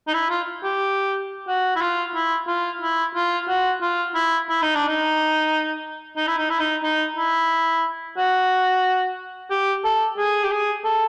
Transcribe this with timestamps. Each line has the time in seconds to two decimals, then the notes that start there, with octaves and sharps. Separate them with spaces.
0.08 D#4
0.14 E4
0.30 F4
0.64 G4
1.48 F#4
1.76 E4
1.81 F4
2.15 E4
2.48 F4
2.82 E4
3.15 F4
3.48 F#4
3.81 F4
4.15 E4
4.49 E4
4.62 D#4
4.75 D4
4.88 D#4
6.17 D#4
6.27 E4
6.38 D#4
6.49 E4
6.60 D#4
6.83 D#4
7.17 E4
8.17 F#4
9.50 G4
9.84 A4
10.18 G#4
10.44 G4
10.51 G#4
10.84 A4